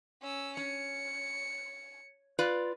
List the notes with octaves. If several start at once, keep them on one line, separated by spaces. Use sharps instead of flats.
C#4 E6
C#4 C#7
F4 B4 D5